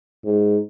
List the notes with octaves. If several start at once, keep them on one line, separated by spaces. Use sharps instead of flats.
G#2